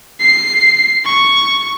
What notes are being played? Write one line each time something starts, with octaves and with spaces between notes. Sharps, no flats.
C7
C#6